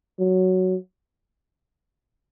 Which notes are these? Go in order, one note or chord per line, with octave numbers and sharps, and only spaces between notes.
F#3